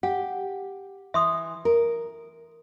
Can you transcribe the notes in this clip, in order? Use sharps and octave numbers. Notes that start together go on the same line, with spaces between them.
G4 F#5
E3 E5 C6 D#6
A#4